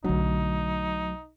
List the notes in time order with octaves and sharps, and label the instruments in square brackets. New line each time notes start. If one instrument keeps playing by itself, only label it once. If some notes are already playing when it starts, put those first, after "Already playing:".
[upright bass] B1 A3 [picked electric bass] D3 D4 [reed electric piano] F#3 [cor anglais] D#4